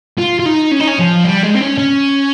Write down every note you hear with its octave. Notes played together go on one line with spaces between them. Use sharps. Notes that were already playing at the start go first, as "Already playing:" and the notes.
F4
F4
D#4
C#4
D#4
C#4
F3
G3
G#3
C4
C#4
C#4